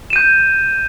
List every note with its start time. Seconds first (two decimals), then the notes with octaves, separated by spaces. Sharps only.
0.10 E7
0.13 D#7
0.16 G6